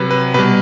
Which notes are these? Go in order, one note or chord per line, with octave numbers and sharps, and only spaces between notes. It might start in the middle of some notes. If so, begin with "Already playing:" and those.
Already playing: C3 F#3 B4
B4
B2 G3 B4